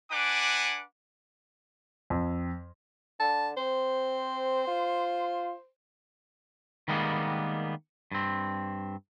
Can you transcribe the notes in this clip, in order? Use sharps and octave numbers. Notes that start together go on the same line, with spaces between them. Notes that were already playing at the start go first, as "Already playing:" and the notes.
D4 B4 F#5 G#5 D6
F2
D3 A5
C4 C5
F4
D#3 G3 G#3 A#3 B3
G2 C4